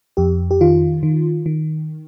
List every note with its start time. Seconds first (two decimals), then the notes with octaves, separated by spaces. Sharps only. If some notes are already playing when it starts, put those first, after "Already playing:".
0.17 F2 G4
0.51 G4
0.61 D#3 F4
1.03 D#3
1.46 D#3